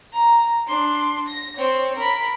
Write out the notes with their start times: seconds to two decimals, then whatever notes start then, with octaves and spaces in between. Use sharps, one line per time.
0.13 A#5
0.67 D4 C6
1.28 A#6
1.56 C4 C#5
1.97 A#4 B5